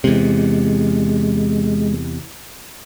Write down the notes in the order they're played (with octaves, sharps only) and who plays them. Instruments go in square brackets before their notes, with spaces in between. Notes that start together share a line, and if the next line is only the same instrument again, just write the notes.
[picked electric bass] E2 C3 [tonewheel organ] G#3